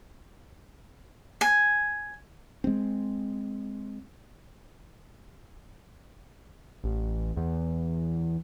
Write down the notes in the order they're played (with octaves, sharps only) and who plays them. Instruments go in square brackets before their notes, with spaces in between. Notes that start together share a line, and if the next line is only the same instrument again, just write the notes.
[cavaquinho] G#5
[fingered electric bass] G#3 C4
[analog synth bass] A1
E2